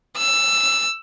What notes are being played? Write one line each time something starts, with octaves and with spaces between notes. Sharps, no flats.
E6